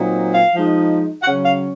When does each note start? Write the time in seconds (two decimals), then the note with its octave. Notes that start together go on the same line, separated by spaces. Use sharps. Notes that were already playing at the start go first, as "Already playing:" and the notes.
Already playing: A#2 F#3 C4 D#4
0.34 F5
0.56 F3 G#3 D#4
1.22 C#3 F#3 C#4 F#5
1.45 F5